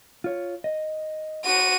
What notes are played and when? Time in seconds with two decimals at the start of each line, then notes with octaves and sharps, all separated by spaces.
0.24 F4 C#5
0.64 D#5
1.45 F#4 D#7